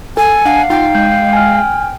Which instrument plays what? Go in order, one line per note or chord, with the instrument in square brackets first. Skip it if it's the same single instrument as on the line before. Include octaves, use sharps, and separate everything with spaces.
[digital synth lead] A4 [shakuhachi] G#5
[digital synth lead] D4 [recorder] F5 [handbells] F#5
[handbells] D#4 [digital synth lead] F4 [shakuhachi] G5
[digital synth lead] G#3 [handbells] G6
[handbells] G#5 F6